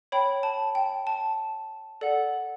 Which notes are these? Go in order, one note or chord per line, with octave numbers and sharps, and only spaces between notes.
C#5 G5 B5
A5
G5
A5
A4 D5 F#5